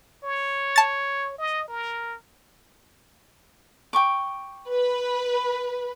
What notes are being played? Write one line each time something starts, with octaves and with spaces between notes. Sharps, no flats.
C#5
A5 A6
D#5
A#4
G5 C#6 D6
B4